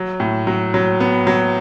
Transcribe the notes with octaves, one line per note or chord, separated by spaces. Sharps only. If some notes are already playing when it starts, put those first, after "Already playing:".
Already playing: F#3
A2
F#3
F#3
B3
F#3